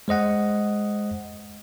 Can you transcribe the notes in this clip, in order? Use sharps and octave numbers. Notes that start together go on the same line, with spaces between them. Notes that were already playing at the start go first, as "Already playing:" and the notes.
G#3 C5 D#5 F#5